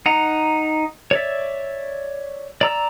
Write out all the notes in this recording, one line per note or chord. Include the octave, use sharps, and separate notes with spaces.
D#4 F#5 A#5
C#5 D5 E5
D5 A#5 E6